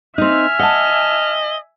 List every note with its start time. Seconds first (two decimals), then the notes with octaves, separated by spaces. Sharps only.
0.18 C4 D#4 E5 G#5 F6
0.59 D#5 F#5 A5